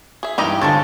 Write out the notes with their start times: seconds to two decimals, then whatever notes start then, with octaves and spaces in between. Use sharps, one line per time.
0.23 G#4 E5
0.38 E2 G2 D#4 E4 G4 D#5 G5 B5
0.61 D3 G#3 F4 C5 C#5 A5 A6